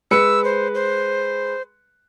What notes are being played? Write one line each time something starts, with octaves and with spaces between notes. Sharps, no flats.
G#3 B4 E6 C#7
C5
C5